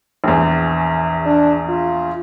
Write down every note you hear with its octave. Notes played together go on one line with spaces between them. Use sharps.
A#1 E2
D4
F4